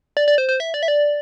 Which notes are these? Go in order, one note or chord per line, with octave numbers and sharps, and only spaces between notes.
D5
D5
C5
C5
E5
D5
E5
D5